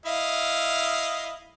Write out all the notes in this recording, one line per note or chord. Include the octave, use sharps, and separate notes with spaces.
E4 D#5 F5